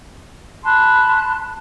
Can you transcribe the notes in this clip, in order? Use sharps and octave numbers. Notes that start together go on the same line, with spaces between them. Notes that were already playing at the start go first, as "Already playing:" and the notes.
A5 B5 C6 F#6